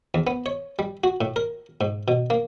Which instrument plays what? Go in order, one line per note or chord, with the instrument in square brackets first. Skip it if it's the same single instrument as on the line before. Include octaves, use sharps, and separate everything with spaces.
[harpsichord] E2
B3
C#5
G3
F#4
A2
A#4
G#2
B2
A#3